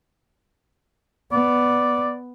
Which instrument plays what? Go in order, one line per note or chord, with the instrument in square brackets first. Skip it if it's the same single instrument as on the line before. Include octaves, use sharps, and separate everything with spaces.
[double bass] B3 [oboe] D5